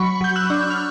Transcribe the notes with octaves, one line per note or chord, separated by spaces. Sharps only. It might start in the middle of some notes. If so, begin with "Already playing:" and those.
Already playing: F#3 B5 C#6
F#3 G6
E6 F#6
D4
F6